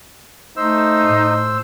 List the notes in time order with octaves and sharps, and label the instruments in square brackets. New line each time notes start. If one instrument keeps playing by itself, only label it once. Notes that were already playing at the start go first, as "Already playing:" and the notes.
[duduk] A3 [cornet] D#4 [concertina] C5 E6
[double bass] A2